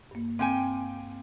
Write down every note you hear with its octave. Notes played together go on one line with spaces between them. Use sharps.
G2 A#3
A#3 C4 G5 G#5